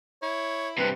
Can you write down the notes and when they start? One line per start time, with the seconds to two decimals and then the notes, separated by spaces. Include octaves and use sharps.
0.22 E4 C#5
0.78 G2 C3 B4